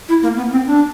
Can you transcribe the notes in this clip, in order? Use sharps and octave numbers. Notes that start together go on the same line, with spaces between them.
E4
A#3
B3
C4
D4